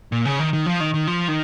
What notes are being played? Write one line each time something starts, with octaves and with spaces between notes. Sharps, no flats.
A#2
C#3
D#3
D#3
F3
D#3
D#3
F3
D#3